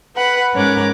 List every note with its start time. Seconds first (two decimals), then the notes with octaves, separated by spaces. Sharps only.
0.14 B4 F#5 B5
0.54 G#2 C#4 A#4 C#5 D6 F#6